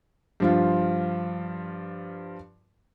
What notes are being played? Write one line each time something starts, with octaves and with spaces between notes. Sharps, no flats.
G2 F3 F4